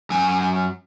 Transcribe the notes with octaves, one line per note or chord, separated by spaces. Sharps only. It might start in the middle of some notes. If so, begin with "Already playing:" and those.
F#2 G#5